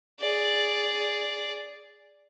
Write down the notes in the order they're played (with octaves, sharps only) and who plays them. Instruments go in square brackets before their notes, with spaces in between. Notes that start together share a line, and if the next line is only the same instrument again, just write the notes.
[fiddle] G#4 D5